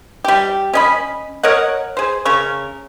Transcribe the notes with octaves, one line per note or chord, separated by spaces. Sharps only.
G3 G4
C#4 D#5 B5
A#4 C#5 D#5 F#5
G#4 C5
C#3 A#4 C#6